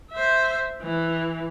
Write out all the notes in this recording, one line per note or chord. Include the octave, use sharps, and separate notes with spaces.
C5 E5
E3